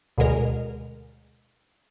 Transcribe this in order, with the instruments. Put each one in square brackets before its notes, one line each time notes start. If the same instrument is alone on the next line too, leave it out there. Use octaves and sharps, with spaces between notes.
[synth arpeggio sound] D2 B2 D3 G#3 A#4 F6